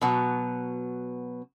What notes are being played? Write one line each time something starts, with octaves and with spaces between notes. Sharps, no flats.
B2 F#3 B3